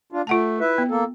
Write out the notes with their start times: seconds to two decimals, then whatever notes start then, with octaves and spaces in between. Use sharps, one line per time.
0.12 D4 F4
0.27 A3 F4 F#5 A5
0.60 E4 B4 E5
0.78 B3
0.90 A#3 A4